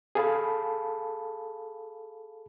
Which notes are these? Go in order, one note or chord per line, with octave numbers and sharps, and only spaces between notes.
G#4 A4 F5 A5 B5